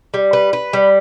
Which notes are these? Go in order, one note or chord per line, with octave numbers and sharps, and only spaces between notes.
G3
B4
B4
G3